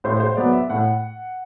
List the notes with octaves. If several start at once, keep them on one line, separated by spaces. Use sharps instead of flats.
A2 C5
C5
F#3 B3 D5
E5
A2 F#5